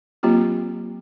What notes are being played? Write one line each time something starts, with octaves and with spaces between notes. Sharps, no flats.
F#3 A#3 C4 F4 G4